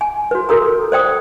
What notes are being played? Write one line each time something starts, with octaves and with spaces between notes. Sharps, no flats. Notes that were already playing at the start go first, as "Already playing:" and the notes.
G#5
F#4 B4
F#4 A4 A#4 A#5
C5 D5 G5 D#6